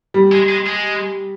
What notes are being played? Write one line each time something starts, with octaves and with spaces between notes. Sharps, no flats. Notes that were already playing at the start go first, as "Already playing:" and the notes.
G3
G#3
G#3
G#3